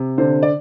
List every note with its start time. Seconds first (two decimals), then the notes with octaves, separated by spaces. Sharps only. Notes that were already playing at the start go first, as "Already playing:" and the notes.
Already playing: C3
0.18 D3 C5
0.43 D5